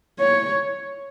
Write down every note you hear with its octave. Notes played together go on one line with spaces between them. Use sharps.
C#5